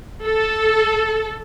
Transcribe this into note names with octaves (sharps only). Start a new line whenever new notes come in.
A4